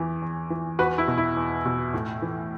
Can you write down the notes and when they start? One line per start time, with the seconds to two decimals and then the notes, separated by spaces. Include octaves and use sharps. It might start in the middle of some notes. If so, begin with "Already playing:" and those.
Already playing: E2 E3
0.22 E2
0.50 E3
0.79 E2 F#4 B4
0.98 E4
1.08 B2
1.18 E4
1.37 E2
1.65 B2
1.94 A2
2.22 E3